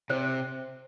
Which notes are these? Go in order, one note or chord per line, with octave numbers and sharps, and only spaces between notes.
C3 C5